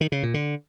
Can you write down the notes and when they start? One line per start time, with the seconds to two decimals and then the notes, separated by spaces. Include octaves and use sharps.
0.01 D#3
0.12 C#3
0.23 A#2
0.34 D3